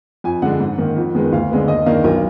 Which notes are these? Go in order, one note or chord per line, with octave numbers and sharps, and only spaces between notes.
F2 G#5
D3 G#3 D4 F#5
G#2
D#3 A#3
F2
D#3 G#3 B3
D2 F5
D3 G#3 B3
D#2 D#5
D#3 A#3 D4 F5
B1 A#4